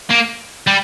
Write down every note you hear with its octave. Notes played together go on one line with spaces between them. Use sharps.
A#3
G3